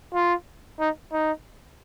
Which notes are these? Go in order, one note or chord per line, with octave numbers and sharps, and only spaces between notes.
F4
D#4
D#4